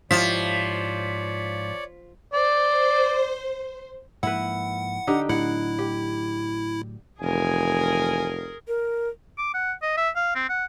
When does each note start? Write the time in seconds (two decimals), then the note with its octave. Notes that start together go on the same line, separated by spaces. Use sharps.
0.11 G#2 F3 E4 G4 C#5 D5 B6
2.33 C5 D5
4.23 G#2 F3 A#3 E4 B4 F#5
5.07 D3 D#4 G4
5.29 A2 F#3 E4 F#5
5.79 G4
7.21 F1 E3 G#4 A#4 G#5
8.68 A#4
9.38 D6
9.54 F#5
9.83 D#5
9.97 E5
10.16 F5
10.35 C4
10.49 F#5